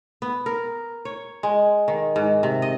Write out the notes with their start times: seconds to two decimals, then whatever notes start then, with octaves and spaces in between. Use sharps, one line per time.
0.22 B3
0.46 A#4
1.05 C#5
1.43 G#3
1.88 D#3
2.16 G#2
2.43 C3
2.62 D#5